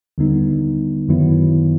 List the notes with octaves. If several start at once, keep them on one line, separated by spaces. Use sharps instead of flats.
D#2 D3 G3 B3 D#4
F#2 D#3 F#3 B3 E4